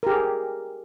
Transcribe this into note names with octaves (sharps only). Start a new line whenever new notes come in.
G4 G#4 A#4